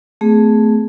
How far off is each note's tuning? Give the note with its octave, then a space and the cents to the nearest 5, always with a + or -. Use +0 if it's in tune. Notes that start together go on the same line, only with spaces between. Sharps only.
A3 +0 C4 -45 G#4 +0